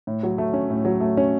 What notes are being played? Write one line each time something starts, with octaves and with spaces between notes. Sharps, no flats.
A2
F#3
A3
C#4
A2
F#3
A3
C#4